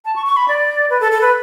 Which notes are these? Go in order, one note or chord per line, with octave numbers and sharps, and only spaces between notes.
A5
C#6
C#6
B5
D5
B4
A4
A4
B4